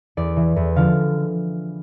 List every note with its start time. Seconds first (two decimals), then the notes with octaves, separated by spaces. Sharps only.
0.17 E2 D5
0.37 E3
0.56 E2
0.76 D3 F3 F5